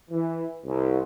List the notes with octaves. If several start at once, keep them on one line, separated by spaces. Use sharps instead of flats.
E3
C2